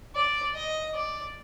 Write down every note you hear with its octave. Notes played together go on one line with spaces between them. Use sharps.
D5
D#5
D5